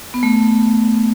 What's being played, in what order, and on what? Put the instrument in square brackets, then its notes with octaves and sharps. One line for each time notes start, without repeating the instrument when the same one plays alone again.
[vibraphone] B3
A3